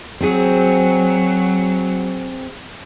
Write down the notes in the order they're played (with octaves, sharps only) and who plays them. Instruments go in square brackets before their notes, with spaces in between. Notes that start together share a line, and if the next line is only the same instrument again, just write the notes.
[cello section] F#3 [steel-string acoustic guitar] C4 G#4